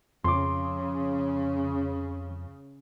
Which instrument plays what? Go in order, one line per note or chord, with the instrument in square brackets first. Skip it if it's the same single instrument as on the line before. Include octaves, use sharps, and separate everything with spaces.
[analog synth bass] F2 [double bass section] C#3 [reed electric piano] C6 D6